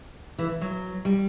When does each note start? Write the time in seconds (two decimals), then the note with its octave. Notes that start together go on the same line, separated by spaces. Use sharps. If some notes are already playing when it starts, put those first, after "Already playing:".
0.39 E3
0.61 F#3
1.05 G3